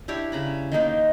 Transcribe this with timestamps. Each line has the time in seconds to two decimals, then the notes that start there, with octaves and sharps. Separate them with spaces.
0.08 D4 E4 G4 C#5
0.32 C#3 A#5 B5
0.72 D#3 A#3 D#4 C5